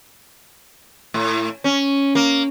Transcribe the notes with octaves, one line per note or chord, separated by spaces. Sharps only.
A2
C#4
A#3